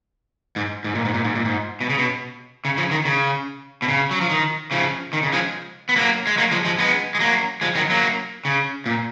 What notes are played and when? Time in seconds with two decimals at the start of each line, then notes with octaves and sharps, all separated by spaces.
0.56 G#2
0.84 G#2
0.95 A#2
1.05 G#2
1.14 A#2
1.24 G#2
1.35 A#2
1.45 G#2
1.81 B2
1.90 C#3
1.98 B2
2.65 C#3
2.77 C#3 F3
2.91 D#3
3.05 C#3
3.82 B2
3.88 C#3
4.11 F#3
4.21 F3
4.30 D#3
4.71 C#3 F3
5.13 D#3
5.23 C#3
5.33 F3 G#3
5.89 B3
5.96 F#3 A#3
6.27 G#3
6.38 F#3 A#3
6.51 F3 G#3
6.65 F3 G#3
6.78 G#3 B3
7.15 G#3
7.20 F#3 A#3
7.61 F3 G#3
7.75 D#3 F#3
7.90 F#3 A#3
8.45 C#3
8.86 A#2